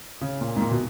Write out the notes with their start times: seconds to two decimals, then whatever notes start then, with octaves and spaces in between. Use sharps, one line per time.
0.21 C#3
0.41 A#2
0.56 G#2
0.61 A#2
0.71 B2